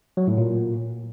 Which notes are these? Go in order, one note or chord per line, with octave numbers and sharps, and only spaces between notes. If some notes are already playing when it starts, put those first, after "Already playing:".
F#3
A2
A#2